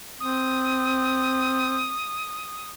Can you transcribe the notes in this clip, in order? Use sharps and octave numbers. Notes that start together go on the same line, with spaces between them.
C4 D#6